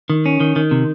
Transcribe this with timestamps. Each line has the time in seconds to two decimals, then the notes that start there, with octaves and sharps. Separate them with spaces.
0.10 D#3
0.26 C#4
0.40 D#3
0.56 D#3
0.71 C3